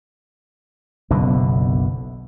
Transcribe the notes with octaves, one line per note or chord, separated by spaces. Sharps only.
F#1 B1 B2 D3